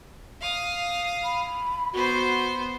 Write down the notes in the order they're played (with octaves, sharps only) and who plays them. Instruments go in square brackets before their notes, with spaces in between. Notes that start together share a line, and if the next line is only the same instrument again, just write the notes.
[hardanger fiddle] F5 D#6
[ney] B5
[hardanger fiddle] B3 C5 [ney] F#4